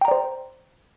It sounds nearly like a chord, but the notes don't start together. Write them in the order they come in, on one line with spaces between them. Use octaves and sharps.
G5 A#5 D5 C5